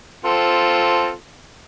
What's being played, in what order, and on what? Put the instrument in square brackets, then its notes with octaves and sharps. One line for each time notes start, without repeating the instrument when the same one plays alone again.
[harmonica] C4 F4 A4